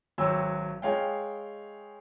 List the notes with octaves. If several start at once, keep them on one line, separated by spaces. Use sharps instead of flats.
G#1 F#3 C#5 G5 E6
G#3 C#5 F5 G5